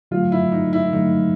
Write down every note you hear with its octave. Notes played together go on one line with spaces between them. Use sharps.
D3 F#3 A3 F4
E4
D#4
E4
D3 F#3 A3 D#4